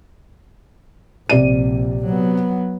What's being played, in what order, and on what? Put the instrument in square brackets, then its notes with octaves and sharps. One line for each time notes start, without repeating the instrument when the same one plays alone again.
[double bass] A#1 [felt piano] C3 D5 D#7
[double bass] F#3 B3